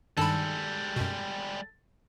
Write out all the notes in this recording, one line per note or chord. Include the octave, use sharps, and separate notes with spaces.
G2 D#3 G3 G#3 A4 A5 B5
F#2 B2